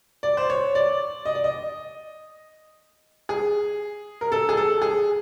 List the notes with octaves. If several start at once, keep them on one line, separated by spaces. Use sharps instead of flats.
D5
C5
C#5
D5
D#5
D5
D#5
G#4
A#4
A4
G#4
A4
G#4